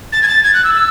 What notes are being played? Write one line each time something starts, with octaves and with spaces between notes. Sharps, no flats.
A6
G#6
A6
G#6
F#6
E6
E6